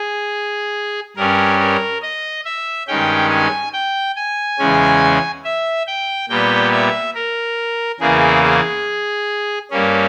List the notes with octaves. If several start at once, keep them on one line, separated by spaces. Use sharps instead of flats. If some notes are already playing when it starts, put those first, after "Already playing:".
Already playing: G#4
G2 G3 C#4 A#4
A#4
D#5
E5
G2 D#3 G#3 C#4 G5
G#5
G5
G#5
E2 C#3 G#3 C#4
E5
G5
A#2 G3 B3 G5
E5
A#4
E2 C#3 E3 A#3 G#4
G#4
G2 G3 A#3 C#4